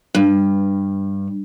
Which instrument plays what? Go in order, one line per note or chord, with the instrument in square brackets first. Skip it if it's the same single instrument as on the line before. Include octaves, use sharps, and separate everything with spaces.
[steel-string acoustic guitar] G2